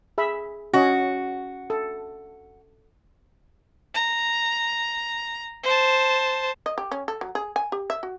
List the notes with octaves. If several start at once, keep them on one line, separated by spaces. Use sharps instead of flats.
G#4 E5 B5
C#4 F#4 D#5
A4
A#5
C5 A5
D#5
G4
C#4
A4
F#3
G#4
G#5
G4
E5
F#4